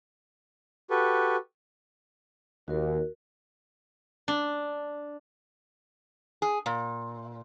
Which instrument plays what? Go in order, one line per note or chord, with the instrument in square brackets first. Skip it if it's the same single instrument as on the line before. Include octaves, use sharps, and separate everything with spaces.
[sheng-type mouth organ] F#4 G4 A4 B4
[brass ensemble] D#2 [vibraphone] F#4 A#4
[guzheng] D4
[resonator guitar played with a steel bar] G#4
A#2